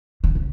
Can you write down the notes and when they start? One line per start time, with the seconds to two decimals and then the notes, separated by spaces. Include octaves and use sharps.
0.24 D3
0.35 C#3